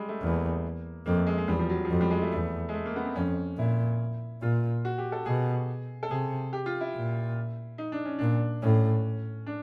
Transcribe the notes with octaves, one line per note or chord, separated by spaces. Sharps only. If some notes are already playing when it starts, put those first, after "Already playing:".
Already playing: G3 G#3
A3
E2 A#3
F2 A#3
A3
G#3
G#3
E2 G3
F3
F#3
F3
F2 F#3
G3
G#3
A3
E2 A3
G#3
A3
A#3
B3
C4
F2 C#4
A#2 E4
A#2 F4
F#4
G4
A4
B2 G#4
A4
C3 G#4
G4
F4
E4
A#2
D#4
D4
C#4
A#2 D4
A2 C#4
D4